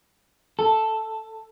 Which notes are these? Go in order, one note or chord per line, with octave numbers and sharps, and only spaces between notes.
A4